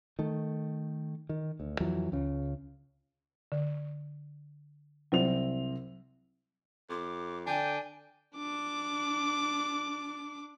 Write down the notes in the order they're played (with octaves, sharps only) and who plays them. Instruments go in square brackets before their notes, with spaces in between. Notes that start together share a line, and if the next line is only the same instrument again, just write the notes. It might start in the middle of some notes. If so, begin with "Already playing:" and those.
[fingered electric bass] D#3 A3
D#3
D2
F2 E3 F#3
C#2 C#3
[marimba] D3
[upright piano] C2 C4 F7 [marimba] F#3
[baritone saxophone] F2 [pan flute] D6
[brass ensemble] D3 D5 G5 [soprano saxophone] D4 [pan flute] G#5
[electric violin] D4 D6